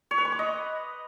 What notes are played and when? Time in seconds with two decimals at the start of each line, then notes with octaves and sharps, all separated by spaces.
0.11 C#5
0.18 B4
0.25 C#6
0.32 D6
0.39 D#5